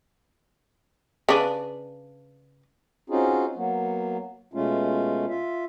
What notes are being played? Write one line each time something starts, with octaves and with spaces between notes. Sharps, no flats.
C#3 D4 B4
C4 C#4 D#4 F4 F#4 G#4
F#3 A#3 B3
B2 G#3 A3 C#4 F4
F4 E5